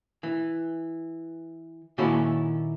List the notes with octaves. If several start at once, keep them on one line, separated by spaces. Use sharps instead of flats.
E3
A#2 D#3 C#4 E4 F#4 A4